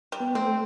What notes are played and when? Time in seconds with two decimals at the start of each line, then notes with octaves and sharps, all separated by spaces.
0.12 G3
0.20 B3
0.35 A3 C4